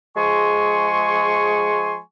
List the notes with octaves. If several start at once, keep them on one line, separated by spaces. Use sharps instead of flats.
F3 G#3 G#4 G#5 C6 C#6